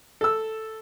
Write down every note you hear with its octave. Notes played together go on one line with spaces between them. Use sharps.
A4 E6